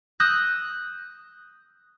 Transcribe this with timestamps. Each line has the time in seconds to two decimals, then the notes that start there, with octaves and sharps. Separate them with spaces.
0.20 D#6 E6 F#6 G6 A#6